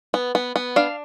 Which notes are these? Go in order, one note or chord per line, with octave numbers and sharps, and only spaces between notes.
B3
B3
B3
D4 F5